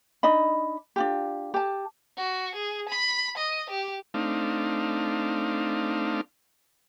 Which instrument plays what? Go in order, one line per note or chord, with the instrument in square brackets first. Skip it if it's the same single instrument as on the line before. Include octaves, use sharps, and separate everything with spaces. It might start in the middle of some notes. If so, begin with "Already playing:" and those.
[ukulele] D4 D#4 D#5 B5
D4 F4 G4
G4 A5
[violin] F#4
G#4
B5
D#5
G4
[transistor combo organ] A3 C4 D4 D#4 F5